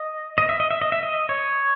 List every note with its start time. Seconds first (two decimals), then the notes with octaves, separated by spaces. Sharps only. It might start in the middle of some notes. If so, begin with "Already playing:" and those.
Already playing: D#5
0.38 D#5
0.49 E5
0.60 D#5
0.71 E5
0.82 D#5
0.92 E5
1.03 D#5
1.29 C#5